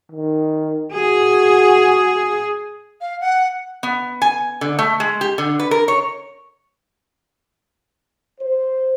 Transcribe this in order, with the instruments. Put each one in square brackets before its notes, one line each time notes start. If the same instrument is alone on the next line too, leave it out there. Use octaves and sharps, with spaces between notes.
[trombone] D#3
[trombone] F#4 [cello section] G#4
[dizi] F5
F#5
[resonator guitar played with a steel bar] B3
G#5
D3
A3
G#3
G4
D3
B4
A#4
C#5
[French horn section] C5